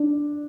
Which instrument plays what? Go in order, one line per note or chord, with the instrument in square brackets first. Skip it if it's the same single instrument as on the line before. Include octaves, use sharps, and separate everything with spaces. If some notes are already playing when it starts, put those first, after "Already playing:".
Already playing: [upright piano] D4